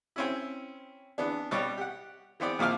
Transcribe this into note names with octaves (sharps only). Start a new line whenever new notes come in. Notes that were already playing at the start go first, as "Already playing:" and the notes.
C4 C#4 E4
E3 B3 D4
B2 G3 C#5 D6
G4 F#5
E3 B3 C4 D5
D#2 A#2 F3 D6 F6